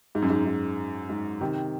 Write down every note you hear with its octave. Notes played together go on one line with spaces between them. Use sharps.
G#2
F#2
G#2
G#2
G#2
C3 D#3